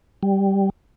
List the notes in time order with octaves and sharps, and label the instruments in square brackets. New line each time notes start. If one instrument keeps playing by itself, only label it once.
[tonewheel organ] G3